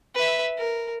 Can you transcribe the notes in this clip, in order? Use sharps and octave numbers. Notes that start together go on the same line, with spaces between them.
B4 E5
A#4